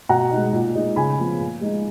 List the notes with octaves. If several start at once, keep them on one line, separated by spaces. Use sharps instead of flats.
B2 F#5 A#5
D#4
G#3
A#2
G#3 D#4
C#3 G#5 B5
F3 B3
A#2
G#3 D#4